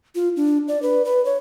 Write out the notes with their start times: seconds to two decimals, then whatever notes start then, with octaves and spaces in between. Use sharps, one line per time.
0.15 F4
0.37 D4
0.68 D5
0.82 B4
1.05 B4
1.25 C#5